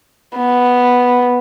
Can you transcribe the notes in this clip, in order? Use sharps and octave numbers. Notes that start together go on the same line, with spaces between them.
B3